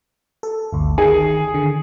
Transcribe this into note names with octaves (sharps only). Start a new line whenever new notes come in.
A4
G1 D2
D#3 G#4
D3